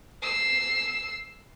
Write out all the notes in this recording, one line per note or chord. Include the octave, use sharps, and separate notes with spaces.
E6 C7